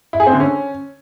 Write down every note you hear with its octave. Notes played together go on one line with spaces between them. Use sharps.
E4
G#4
C4
D3
C#4